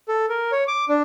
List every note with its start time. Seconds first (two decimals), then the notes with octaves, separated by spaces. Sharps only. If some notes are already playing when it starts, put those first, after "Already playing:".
0.08 A4
0.29 A#4
0.52 C#5
0.68 D6
0.89 D4